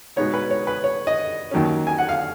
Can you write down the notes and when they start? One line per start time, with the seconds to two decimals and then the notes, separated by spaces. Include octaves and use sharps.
0.16 B2 G#3 B3 D#4 C#5
0.34 B4
0.51 C#5
0.67 B4
0.84 C#5
1.07 D#5
1.51 D#2 D#3 F#3 C#4
1.87 G#5
1.98 F#5
2.09 F5